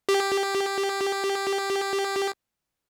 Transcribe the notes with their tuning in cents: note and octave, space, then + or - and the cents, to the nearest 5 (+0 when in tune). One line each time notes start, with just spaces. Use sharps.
G4 +5